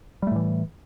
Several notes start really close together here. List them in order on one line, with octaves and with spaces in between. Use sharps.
G3 A3 A2 E3